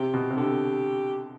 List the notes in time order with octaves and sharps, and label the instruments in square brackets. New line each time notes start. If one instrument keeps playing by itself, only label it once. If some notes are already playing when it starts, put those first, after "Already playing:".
Already playing: [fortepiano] C3 [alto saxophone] G4
[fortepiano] B2
C3
[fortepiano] D3 [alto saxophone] G4